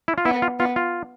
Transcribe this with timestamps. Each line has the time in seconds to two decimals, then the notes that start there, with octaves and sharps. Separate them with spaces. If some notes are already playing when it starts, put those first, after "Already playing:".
0.08 E4
0.18 F4
0.25 B3 E4
0.42 F4
0.59 B3 F4
0.76 F4